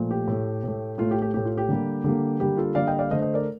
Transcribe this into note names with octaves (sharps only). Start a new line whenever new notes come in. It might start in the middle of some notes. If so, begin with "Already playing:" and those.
Already playing: A#2 F3 A3
G4
A2 A3
A2 A3
A2 A3 F4
G4
G4
A2 A3 G4
F4
G4
D3 G3 A#3
D3 G3 A#3
D3 G3 A#3 G4
F4 A4
D3 G3 A#3 D5 F5
D#5 G5
D5 F5
D3 A3 C5 D#5
C5 D#5
A#4 D5